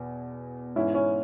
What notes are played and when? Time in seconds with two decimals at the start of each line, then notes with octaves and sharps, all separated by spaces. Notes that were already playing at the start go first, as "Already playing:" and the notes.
Already playing: E2 B2
0.76 G#2 E3 C#4 E4
0.94 C#4 E4